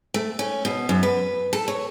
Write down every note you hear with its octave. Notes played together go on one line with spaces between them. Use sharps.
A3
C#4
B2
F#2
B4
A4
C#5